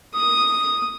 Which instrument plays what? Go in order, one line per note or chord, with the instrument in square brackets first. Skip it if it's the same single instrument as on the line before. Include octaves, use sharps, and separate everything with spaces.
[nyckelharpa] D#6